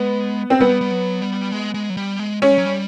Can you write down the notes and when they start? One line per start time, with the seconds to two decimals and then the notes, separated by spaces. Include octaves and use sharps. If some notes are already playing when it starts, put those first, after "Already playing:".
Already playing: G#3 B3
0.50 C4
0.60 G3 B3
0.81 G3
0.91 F#3
1.21 G3
1.52 G#3
1.74 G#3
1.90 F#3
1.97 G3
2.19 G#3
2.42 G#3 C#4
2.51 G3
2.58 F#3
2.65 G3